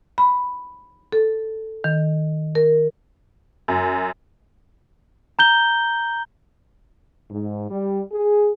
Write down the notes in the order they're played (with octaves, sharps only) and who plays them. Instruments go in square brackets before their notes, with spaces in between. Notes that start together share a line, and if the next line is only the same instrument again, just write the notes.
[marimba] B5
A4
D#3
A#4
[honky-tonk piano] F#2
[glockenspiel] A#5 G6 G7
[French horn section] G#2
G3
G#4